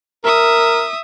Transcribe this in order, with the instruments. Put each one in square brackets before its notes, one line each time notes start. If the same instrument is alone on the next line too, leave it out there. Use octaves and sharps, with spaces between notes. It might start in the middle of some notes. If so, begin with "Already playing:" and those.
[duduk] A#4 [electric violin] E5 D#6